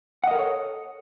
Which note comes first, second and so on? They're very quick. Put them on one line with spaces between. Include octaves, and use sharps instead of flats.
F#5 D#5 A#4 A4 C#5